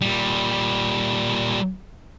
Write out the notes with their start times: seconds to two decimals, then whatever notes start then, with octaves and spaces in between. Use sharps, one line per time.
0.01 A#2 G3